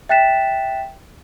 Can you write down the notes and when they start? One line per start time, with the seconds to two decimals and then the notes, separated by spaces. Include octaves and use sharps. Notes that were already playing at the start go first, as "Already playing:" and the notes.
0.09 E5 G5 F#6 A6 B6 E7